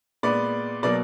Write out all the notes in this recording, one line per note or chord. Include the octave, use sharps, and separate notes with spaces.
A#2 G#3 B3 D5
B2 F#3 A#3 D5